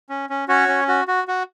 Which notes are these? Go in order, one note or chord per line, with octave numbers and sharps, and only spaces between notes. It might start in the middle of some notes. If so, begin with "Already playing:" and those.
C#4
C#4
C#4 F#4 C#5
C#4
F#4
F#4
F#4